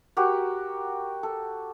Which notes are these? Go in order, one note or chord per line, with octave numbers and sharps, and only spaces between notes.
F#4 G4 A#4 F#5
A4